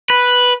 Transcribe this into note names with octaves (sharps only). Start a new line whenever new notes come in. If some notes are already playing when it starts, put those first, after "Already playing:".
B4